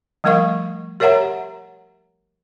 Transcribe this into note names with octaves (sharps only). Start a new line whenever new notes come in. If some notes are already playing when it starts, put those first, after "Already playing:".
F3 G3 A3 A#4 F5 C#6
G4 A#4 C#5 E5 F#5 A#5